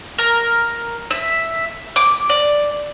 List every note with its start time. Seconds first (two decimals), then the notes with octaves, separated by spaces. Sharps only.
0.18 A#4
1.11 E5
1.96 D6
2.30 D5